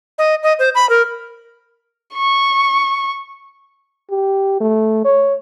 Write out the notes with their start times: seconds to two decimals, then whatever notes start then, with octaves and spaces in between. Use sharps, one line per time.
0.18 D#5
0.43 D#5
0.59 C5
0.75 B5
0.89 A#4
2.15 C#6
4.11 G4
4.61 A3
5.05 C#5